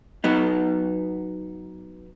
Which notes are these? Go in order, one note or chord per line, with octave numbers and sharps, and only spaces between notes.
F#3 B3 D#4